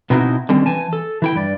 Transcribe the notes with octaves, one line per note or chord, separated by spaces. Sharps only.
B2 B3 C4 D#4 E4 F#4
D3 D#3 G3 C4 C#4
E3 G#5 A5
A4
E3 E4 G5
G2 D5